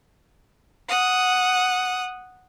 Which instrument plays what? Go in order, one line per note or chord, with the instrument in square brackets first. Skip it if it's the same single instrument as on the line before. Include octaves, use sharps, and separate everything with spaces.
[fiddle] F#5 D#6